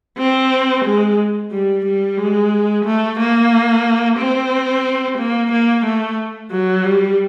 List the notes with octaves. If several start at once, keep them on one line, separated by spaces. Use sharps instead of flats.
C4
G#3
G3
G3
G#3
A3
A#3
C4
A#3
A#3
A3
F#3
G3